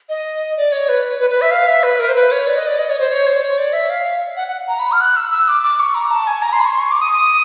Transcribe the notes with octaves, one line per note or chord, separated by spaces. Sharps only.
D#5
D5
C#5
B4
B4
B4
E5
F5
E5
B4
A#4
C5
B4
C#5
D5
D#5
D5
D#5
C#5
C5
C#5
C5
D5
C#5
D5
E5
F5
F#5
F#5
A#5
B5
F6
F#6
E6
E6
D6
D6
C#6
A#5
A5
G#5
A#5
C6
B5
C#6
C6
C#6
D6
D#6
D#6